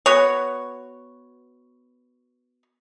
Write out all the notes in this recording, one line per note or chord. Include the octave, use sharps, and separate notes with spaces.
B3 F#4 C#5